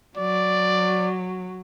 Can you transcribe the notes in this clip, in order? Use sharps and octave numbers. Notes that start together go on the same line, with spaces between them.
F#3 D5